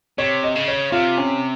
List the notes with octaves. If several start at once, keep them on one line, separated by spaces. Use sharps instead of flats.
C3 C#5
D#5
C#3
C#5
C3 F4
C#4